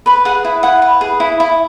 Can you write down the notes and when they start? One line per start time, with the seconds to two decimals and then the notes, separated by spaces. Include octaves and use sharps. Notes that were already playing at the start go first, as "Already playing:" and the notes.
0.06 B4 B5
0.25 G#4 F#5
0.45 E4
0.63 E4 F#5
0.82 B4
1.01 G#4
1.20 E4
1.40 E4